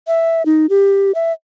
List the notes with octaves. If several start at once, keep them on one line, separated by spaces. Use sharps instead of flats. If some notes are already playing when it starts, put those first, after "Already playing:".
E5
D#4
G4
E5